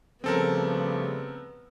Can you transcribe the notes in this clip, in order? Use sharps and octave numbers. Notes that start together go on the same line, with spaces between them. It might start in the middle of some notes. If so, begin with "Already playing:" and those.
C#3 F3 G3 A3 B3 C4 A4 A#4